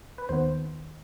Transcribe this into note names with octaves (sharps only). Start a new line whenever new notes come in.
B4
D#2 D#3 B3 C5